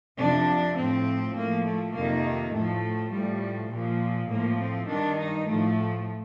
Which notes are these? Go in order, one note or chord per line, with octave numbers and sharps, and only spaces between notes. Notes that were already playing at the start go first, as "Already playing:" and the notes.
F2 C3 F3 D4
A2 F3 C4
A2 F3 A#3
A3
F2 C3 D#3 A#3
A2 F3 A3
A2 F3 G3
A#2 F3
A2 F3 A#3
C4
G2 D#3 D4
D#4
A2 F3 A3